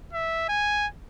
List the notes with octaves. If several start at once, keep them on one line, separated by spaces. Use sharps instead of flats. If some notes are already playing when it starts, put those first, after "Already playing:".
E5
G#5